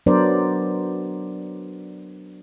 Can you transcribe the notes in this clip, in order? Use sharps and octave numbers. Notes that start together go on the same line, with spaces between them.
F#3 B3 D4 A#4 C5 D5